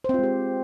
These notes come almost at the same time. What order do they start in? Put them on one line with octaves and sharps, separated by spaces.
C5 C4 F4 G#3 G4